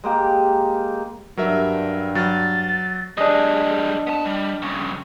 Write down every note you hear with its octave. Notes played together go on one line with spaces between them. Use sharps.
G#3 A#3 G4
G2 F#3 A#4 E5
F#3 F6 A6
G3 D4 G#4 D#5
B3 A5
G3
G2 C#3